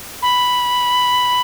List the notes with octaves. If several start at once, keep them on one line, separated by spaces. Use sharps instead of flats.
B5